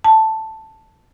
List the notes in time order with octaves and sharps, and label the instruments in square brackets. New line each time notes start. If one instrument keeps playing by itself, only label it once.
[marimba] A5